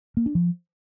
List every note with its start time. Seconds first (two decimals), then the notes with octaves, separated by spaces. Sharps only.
0.17 A#3
0.26 D4
0.35 F3